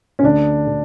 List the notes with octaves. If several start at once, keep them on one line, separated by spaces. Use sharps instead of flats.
C#4
D2 D4
D3